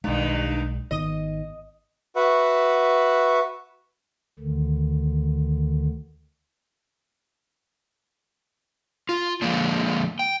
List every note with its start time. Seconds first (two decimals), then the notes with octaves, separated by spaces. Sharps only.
0.04 B1 G2 D#3 G#3
0.91 G#1 D#3 B3 D#5
2.16 F#4 B4 E5 F#5
4.39 D2 D3 D#3
9.09 F4
9.42 D3 F3 G#3 A#3 D4
10.19 G5